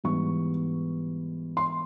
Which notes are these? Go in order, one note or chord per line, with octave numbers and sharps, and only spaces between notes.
G#2 E3 G3 B3 C#6
C6